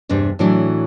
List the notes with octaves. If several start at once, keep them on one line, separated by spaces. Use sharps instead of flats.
E2 G2 C3 D4
A2 E3 F#3 D4